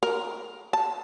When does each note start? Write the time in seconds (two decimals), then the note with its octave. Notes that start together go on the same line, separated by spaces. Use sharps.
0.03 A#4
0.73 A5